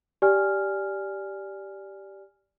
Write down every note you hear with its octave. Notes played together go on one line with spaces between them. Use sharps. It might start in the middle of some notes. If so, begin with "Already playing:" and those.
G4 D5 G#5 F6